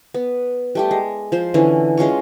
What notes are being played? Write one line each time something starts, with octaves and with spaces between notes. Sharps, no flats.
B3
G3 A3 G4
G#3
F3 C5
D3 E3 C#4
G#3 C#4 F4 C#5